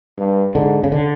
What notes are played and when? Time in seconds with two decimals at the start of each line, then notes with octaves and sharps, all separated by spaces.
0.18 G2
0.54 G#2 D3
0.83 C#3
0.92 D3